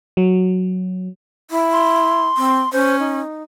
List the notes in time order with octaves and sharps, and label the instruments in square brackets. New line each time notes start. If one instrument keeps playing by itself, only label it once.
[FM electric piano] F#3
[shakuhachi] E4
[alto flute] C6
[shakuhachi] C4
[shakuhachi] C#4 [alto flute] C5
[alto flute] D#4